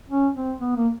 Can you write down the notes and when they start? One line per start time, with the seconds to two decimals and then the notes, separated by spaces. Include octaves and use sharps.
0.10 C#4
0.35 C4
0.60 B3
0.76 A#3